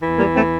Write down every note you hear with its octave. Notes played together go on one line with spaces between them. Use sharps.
E2 E3
G3 A#3
A3 C4